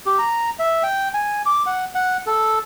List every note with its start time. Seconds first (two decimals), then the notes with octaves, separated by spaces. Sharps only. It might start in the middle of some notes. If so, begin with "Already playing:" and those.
0.06 G4
0.18 A#5
0.59 E5
0.83 G5
1.14 G#5
1.46 D6
1.66 F#5
1.95 F#5
2.27 A4